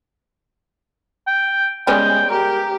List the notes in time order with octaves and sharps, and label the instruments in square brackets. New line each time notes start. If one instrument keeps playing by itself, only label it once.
[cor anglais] G5
[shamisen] G3 B3 C#4 [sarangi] G#3 [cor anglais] G5
[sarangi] G4 [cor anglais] A#4